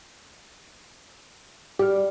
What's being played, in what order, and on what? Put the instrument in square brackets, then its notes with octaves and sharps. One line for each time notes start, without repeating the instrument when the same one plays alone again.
[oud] G3 [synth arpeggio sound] G4 D6 F6